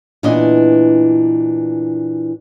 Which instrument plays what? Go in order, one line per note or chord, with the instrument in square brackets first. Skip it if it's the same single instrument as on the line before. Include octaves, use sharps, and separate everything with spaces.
[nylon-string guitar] A#2 E3 B3 D4 E4 D#5